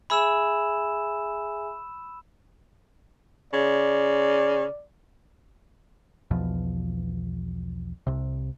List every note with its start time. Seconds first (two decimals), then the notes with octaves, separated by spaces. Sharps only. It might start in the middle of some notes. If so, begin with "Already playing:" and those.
0.10 G#4 E5 G#5 B5 E6 E7
3.53 C#3 D5
6.31 B1 E2 B2 F3
8.07 C2 C3